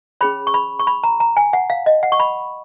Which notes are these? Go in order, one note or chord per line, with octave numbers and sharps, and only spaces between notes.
C#4 G#4 C#5 B5
C#6
B5
C#6
B5
A#5
A#5
G#5
F#5
F5
D#5
F#5
C#6
B5